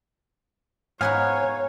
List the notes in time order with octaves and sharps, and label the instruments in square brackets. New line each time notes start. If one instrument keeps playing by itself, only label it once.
[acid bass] G#2 [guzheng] B3 A#4 F#5 [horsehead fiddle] C#5 [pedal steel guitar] F5 G#5